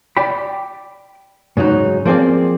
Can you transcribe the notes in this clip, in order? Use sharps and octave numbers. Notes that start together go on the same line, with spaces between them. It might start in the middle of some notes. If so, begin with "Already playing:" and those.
D5 G5 B5
G#2 C#3 F#3 D#4
F3 A#3 C4 G#4 D5